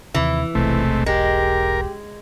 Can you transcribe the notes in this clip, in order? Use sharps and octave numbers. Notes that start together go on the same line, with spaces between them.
D#2 C3 E3 E4
E1 B1 C3 G#3 A3
G#3 G4 A#4